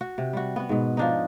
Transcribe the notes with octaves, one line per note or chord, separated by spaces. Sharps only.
F#4
C3
G3 F#4
B3 F#4
G#2 B2
F3 D4 D#4